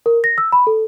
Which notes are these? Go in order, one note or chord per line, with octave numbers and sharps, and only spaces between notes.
A#4
A#6
E6
B5
A4